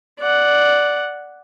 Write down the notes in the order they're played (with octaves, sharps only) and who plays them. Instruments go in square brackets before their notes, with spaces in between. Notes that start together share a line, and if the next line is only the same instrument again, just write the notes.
[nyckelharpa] D5 F#5